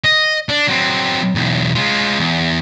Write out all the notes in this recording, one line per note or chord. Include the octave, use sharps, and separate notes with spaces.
D#5
D4
F#3 C4
B1 E2
G#3 F4
E2